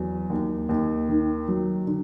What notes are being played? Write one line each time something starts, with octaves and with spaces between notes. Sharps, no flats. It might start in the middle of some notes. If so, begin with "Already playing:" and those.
Already playing: E2 F#3
D#2
D#2
D#3
F#3
D3